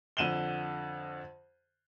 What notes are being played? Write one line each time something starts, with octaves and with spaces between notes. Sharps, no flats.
F2 D3 D#7 E7 F#7 G7